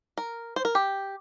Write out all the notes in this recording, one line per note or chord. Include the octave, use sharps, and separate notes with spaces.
A#4
C5
A#4
G4